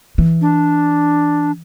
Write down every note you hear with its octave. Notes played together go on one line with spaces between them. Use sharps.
E3
D4